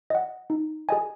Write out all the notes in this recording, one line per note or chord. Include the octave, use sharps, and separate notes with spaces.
D#5 F#5
D#4
G#4 D#5 G#5